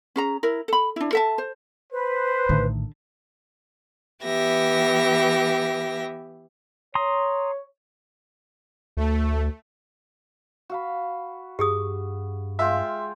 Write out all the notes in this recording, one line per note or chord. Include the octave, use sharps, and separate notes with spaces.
C#4 G#4 A#5
E4 A#4
A4 B5
D4 E4
A4 E5 A5
C5
B4 C5
A#1 A2 D3 D#3
E3 B3 G4 E5 A#6
C#5 A#5 C6 D#6
D2 A3
F#4 F5 B5
G2 G4 G#4 D#6
G#3 F4 E5 G5